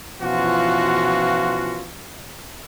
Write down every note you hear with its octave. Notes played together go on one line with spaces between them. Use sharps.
B2 E3 F3 C#4 F4 F#4